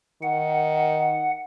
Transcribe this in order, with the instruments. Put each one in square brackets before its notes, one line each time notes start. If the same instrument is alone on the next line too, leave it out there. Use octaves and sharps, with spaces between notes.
[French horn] D#3 [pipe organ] F#5